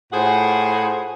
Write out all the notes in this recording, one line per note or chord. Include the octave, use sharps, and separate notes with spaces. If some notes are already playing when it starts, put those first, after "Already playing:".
A2 F4 G#4 C5 F#5